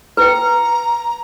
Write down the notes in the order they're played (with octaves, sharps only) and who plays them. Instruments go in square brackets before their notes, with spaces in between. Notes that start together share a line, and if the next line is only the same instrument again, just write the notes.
[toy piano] B4 G5 [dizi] A#5